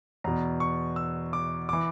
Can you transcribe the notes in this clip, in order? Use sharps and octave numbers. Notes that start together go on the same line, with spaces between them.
E2 B2 A#5
C#6
E6
D6
E3 D6